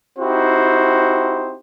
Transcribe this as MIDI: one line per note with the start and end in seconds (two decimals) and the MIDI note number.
0.18 1.57 60
0.18 1.57 63
0.18 1.57 64
0.18 1.57 66
0.18 1.57 67
0.18 1.57 72